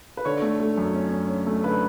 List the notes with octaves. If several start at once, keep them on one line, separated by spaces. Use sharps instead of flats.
B4
D3 C#5
A3
A3
F#2
C#4
C#4
C#4
A3
D3 B4